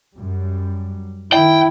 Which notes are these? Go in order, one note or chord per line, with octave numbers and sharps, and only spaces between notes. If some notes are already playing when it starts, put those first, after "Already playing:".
F#2 G3
D#3 E4 G5